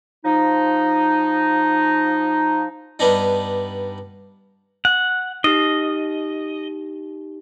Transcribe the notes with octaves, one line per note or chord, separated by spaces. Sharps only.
F3 D#4
G2 B3 D4 D#4
F#5
D#4 G4 D#5